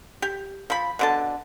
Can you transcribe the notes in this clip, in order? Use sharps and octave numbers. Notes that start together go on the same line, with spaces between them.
G4
F3 B5
B2 D3 A5